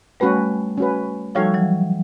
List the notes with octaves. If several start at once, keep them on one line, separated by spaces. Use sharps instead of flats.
G3 A3 C#4 F#4 B4
C#4 F#4 B4
F3 G3 D#4 F#4 A4 C#5 F5
E3 F#3